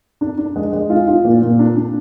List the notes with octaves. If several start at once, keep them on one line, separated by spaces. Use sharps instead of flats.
D4
D4
G#3
G#3
F4
F4
A#2
A#2
D4
D4